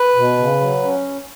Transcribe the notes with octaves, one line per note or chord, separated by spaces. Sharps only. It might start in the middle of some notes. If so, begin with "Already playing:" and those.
Already playing: B4
B2
C#3
F#3
C#4